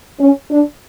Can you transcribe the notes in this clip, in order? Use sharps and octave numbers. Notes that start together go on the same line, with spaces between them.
C#4
D4